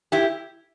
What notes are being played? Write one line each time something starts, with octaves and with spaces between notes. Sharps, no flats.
E4 G4